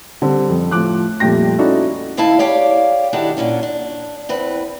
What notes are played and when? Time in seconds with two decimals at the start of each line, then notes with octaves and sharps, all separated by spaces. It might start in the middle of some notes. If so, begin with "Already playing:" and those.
0.22 D3 G3 C4
0.50 F2
0.71 A2 F3 D6 F#6
1.20 F2 A#2 G3 A3 G5 A#6
1.58 C#4 D#4 E4 F#4 A4 D5
2.17 D#2 A3 E4 F5 A5
2.39 G4 C#5 D5 F5 G5
3.13 D#3 D4 E4 F#4 G4 A4
3.37 A#2 D3 C#4 D4
3.63 D4
4.29 E2 C4 B4